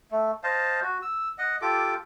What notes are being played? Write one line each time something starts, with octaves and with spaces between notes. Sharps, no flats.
A3
C5 D#5 F5 A5
F#4
E6
D#5 F#5
F4 G4 A4 D6